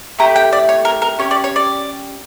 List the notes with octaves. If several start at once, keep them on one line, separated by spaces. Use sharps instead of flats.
A3 E4 G4 A#5
G5
D5
C#5
A#4
A#4
C#4 G4 C#5
D5
C#5
D5